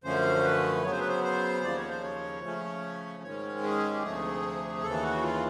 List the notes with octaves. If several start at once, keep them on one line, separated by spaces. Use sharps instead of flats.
F#2 D3 F3 A3 C#4 C5
B4
C#3 F#3 B3 C#5
C5
B4
C5
C5
D#2 C#3 F3 D5
C#5
C5
C#5
C#3 F3 A3 C#4
G#2 D#3 G#3 C#4 C#5
G#4
G4
D2 C3 F3 A3 G#4
D#2 C#3 E3 A4
F#4
F4